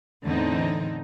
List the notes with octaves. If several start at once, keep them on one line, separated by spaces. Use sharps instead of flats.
E2 A2 D3 E3 C4 D#4